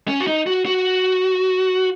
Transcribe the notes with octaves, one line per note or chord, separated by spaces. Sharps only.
C#4
F#4
D#4
F#4
F#4